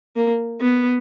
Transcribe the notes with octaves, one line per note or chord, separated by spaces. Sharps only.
A#3
B3